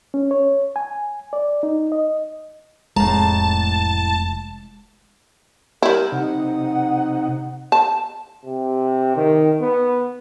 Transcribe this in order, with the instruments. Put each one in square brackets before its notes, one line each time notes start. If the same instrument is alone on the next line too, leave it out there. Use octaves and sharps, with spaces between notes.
[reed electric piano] C#4
C#5
G#5
D5
D#4
D#5
[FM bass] F1 [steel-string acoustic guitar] A2 A#5 [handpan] G#3 [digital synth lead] A5
[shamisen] G3 E4 [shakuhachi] A#4
[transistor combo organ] C3 D#4 [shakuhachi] F#5
[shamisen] A5
[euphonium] C3
D#3
B3